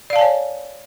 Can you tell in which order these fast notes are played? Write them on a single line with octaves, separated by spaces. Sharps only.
D5 F5 A5 G#5 C#5